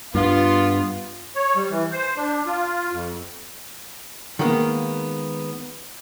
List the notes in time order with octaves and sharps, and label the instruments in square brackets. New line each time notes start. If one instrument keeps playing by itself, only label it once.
[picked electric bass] G2 [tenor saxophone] B3 [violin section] F4
[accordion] C#5
G3
E3
C5
D4
F4
F2
[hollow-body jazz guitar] D#3 G#3 A#3 B3